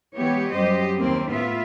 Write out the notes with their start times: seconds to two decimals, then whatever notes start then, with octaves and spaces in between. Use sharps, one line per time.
0.15 E3 G#3 B3 G4 C#5
0.51 F#2 G3 G4 C5 D#5
0.98 D#2 A#3 C4
1.33 A2 B3 F4 E5